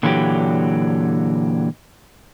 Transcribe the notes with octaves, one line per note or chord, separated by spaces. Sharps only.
A#2 D3 E3 F#3 G4